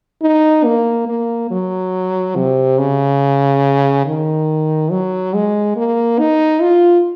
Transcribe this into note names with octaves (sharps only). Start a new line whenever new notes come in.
D#4
A#3
A#3
F#3
C3
C#3
D#3
F#3
G#3
A#3
D#4
F4